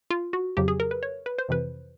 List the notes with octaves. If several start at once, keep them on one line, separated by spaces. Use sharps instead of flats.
F4
F#4
F2 C#3 F#3 G4
G#4
A#4
B4
C#5
B4
C5
F2 C3 E3 B4